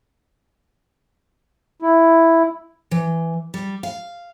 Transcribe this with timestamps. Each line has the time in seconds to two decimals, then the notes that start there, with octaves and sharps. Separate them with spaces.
1.82 E4
2.91 E3
3.54 G3
3.83 F5